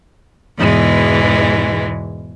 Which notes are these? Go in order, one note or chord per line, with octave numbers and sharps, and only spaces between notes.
E2 G#2 B2 E3 G#3